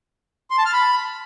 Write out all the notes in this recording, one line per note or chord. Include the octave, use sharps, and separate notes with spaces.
C6
A5
F6
B5